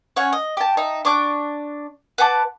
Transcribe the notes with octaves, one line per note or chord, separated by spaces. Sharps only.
C#4 C#5 F#5
D#5
G4 A5
D#4 E5
D4 C#6 D6 F#6
B4 F#5 A5 D6